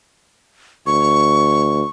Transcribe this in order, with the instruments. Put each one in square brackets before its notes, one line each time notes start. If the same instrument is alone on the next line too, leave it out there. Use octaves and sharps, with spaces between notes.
[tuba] D2 [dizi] C#6